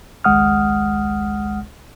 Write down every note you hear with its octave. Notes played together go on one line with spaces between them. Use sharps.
G#1 C#2 G#3 F#5 D#6 F6